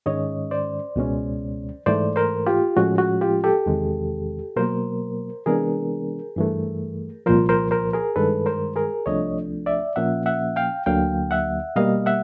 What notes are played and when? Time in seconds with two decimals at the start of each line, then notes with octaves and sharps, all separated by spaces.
0.06 G#2 D#3 G#3 C#4 C#5 D#5
0.51 C5 D5
0.96 C#2 B2 G#3 C#4
1.86 G#2 E3 A3 C5 D5
2.16 A#4 C5
2.46 F4 G4
2.77 A2 F3 G#3 C#4 F#4
2.98 F#4
3.21 F4 G4
3.44 G4 A4
3.66 E2 C3 D#3 G#3
4.56 B2 F#3 A#3 A#4 C5
5.46 C3 E3 G#3 B3 D4 G#4 A#4
6.36 G2 E3 A3
7.26 C2 A#2 F3 A#4 C5
7.49 A#4 C5
7.71 A#4 C5
7.93 G#4 A#4
8.16 G2 D#3 G#3 A4 B4
8.46 A#4 C5
8.76 G#4 A#4
9.06 C2 C3 F3 A3 D4 C#5 D#5
9.66 D5 E5
9.96 A#2 F3 A#3 C#4 E5 F#5
10.26 E5 F#5
10.56 F5 G5
10.86 D2 D3 F#3 A#3 F5 G5
11.31 E5 F#5
11.76 B2 G3 A#3 D#5 F5
12.06 E5 F#5